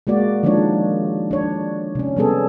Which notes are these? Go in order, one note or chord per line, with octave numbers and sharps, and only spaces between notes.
G#3 A#3 F#4 D5
D#3 F3 G#3 A#3 D4 C#5
D4 C#5
C3 C#4
C3 G3 B3 C#4 G#4 A4